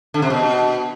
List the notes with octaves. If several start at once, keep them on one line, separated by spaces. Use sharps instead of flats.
D3
C3
B2